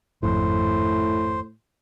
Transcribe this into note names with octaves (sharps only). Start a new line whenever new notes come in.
G#1 F2 A2 C5